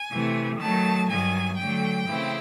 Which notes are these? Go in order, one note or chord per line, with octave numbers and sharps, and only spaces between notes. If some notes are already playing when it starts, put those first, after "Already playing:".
Already playing: G#5
C3 E3 A3
D#3 F#3 A3 A5
G2 D#3 F#3 G#5
D3 F#3 A3 G5
C#3 E3 A3 C4 E4